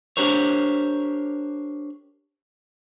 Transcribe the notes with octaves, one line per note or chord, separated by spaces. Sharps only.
D4 G4 A#4 C5 C#5